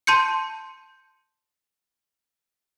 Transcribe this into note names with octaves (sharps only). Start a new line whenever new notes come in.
A5 C6 G6 C#7